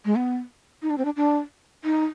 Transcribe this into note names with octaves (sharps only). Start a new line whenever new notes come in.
G#3
B3
D#4
D4
C4
D4
D4
D#4